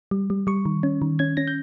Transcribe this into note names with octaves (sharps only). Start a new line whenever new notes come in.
G3
G3
G3 C#6
D#3
C#4
D#3
C#4 G#6
C#4 A#6
G6